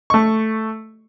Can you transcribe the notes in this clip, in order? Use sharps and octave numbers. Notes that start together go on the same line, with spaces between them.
A3 C#6